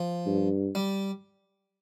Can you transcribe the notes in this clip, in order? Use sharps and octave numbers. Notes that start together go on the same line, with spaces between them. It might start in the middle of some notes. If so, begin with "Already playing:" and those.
Already playing: F3
G2
G3